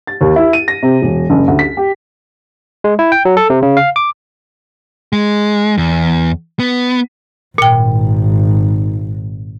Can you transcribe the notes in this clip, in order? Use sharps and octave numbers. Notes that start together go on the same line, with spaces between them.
A6
D#2
E4
D#7
A#6
C3
E1
F#1
D2
B6
G4
G#3
E4
G5
F#3
A4
C3
C#3
F5
D6
G#3
E2
B3
G#1 A#2 G5